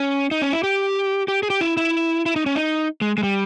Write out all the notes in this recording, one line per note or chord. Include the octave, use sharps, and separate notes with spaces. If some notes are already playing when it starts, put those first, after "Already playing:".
Already playing: C#4
D#4
C#4
E4
G4
G4
G#4
G4
E4
E4
E4
D#4
C#4
D#4
G#3
G#3
G3